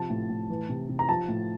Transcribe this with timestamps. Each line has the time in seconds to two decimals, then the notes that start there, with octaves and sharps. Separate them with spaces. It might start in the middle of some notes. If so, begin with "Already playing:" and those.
Already playing: C3 F3 A5
0.10 A2
0.29 A2
0.50 E3
0.69 C3
0.89 C3
0.99 A#5
1.09 F3 A5
1.28 A2